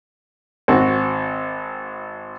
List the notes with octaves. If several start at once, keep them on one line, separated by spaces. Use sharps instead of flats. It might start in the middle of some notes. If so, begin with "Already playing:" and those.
G#1 C4 F#4